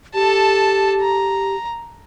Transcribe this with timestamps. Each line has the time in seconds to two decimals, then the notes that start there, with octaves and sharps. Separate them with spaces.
0.14 G4 A4 A5
1.01 A#5